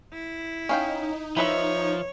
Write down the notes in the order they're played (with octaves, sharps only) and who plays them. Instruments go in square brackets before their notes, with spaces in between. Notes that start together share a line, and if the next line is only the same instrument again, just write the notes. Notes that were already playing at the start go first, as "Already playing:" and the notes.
[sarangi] E4
[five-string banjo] C#4 F5 G5 [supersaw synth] D#4
[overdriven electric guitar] F3 [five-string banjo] E4 B4 E5 [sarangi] C#5